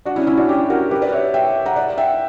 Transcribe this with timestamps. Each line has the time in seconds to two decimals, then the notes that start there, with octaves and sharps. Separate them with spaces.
0.05 D4 F#4
0.16 C#4 E4
0.27 C#4 E4
0.37 D4 F#4
0.49 E4 G4
0.70 F#4 A#4
0.91 G4 B4
1.02 B4 D5
1.12 C#5 E5
1.34 E5 G5
1.66 F#5 A#5
1.76 D5 F#5
1.98 E5 G5